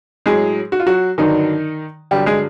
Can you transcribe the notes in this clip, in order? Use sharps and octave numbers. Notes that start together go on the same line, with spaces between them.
A2 F#3 G#3 G#4
F#4
F4
F#3 F#4
G2 D3 D#3 F#3 D#4
G2 D3 F#3 G3 G4
G#3 G#4